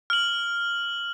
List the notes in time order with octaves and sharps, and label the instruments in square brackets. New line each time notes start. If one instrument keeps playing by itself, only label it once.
[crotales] F6 F#7